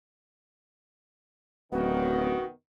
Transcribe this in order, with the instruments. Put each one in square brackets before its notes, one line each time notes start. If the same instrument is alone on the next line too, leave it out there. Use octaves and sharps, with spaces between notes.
[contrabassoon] D1 [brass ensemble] F#2 C3 D#3 [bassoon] B3 [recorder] F#4